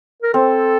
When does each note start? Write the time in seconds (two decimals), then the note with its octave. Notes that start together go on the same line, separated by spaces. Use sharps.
0.22 A#4
0.34 C4 A4